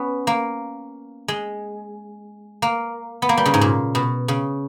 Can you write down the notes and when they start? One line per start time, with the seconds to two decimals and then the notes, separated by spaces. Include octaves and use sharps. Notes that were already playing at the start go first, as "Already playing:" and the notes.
Already playing: B3 C#4
0.27 A#3
1.28 G#3
2.62 A#3
3.22 B3
3.29 A#3
3.37 G3
3.46 C#3
3.54 G#2
3.61 A#2
3.95 B2
4.28 C#3